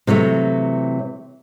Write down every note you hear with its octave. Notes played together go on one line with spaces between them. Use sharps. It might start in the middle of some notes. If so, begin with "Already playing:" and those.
C3 E3 F#3 A3